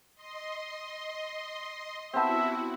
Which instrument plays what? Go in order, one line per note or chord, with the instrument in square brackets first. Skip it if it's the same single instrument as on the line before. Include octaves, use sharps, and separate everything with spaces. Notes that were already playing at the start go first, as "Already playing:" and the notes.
[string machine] D#5 C6
[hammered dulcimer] B3 C4 [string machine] E4 F#4 [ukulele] G4 C5 A5 [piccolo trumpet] E5